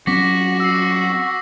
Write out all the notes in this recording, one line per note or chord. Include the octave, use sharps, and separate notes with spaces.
F#3 C4 C#4 F#4 D6 A#6 B6
E6 C7